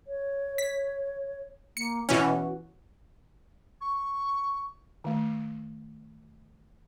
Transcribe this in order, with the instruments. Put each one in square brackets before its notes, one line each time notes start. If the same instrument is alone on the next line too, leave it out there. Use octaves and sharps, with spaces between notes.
[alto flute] C#5
[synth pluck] B6
[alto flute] A#3 [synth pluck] C#7
[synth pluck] B2 E3 C#4 [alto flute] F#4
[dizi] C#6
[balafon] D#3 A3